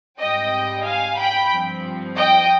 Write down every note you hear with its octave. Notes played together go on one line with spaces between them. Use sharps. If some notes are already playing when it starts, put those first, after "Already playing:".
G#2 G3 C4 D#5 G5
F5 G#5
G5 B5
G2 F3 C4
D#5 G5